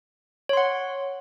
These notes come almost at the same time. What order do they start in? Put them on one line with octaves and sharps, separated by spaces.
C#5 C6 F#5